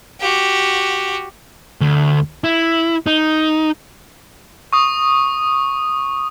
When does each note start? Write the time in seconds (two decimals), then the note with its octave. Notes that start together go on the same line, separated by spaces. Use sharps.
0.21 F#4 G4
1.81 D2
2.44 E4
3.07 D#4
4.73 C#6 D#6